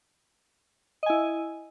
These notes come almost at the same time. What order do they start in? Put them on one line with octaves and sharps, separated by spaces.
D#5 G#5 E4